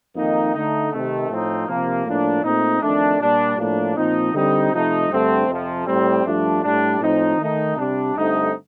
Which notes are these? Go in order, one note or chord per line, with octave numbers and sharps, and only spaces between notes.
F2 D#3 A#3 D#4
D3 A3 D#4
C3 D#3 A3
A2 F3 C4 D#4
C3 F3 A#3
A2 F3 A#3 D4
A#2 A3 C4 D#4
F2 D#3 A3 D4
A#2 G3 D4
A2 F3 A#3 D4
A#2 F3 C4 D#4
D3 G3 C4 D#4
C3 F3 A3 D#4
G2 D3 A3 C4
F2 C3 F3
A2 G3 C4
G2 F3 A3 D4
A2 G3 D4
A2 F3 C4 D#4
D#3 A3 D#4
C3 G3 D4
G2 D3 A3 C4 D#4